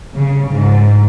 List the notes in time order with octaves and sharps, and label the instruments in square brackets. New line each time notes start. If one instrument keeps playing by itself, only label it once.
[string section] C#3
G#2